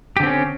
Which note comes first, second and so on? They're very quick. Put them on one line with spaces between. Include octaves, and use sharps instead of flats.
G4 D3 C4 C#4